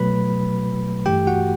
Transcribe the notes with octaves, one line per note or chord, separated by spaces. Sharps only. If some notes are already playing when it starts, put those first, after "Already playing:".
Already playing: B2 F#3 A3 B4 B5
G2 E3 A3 G4 G5
F#4 F#5